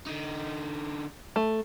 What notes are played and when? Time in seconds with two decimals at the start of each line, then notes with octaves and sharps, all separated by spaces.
0.07 D3 D#4
1.36 A3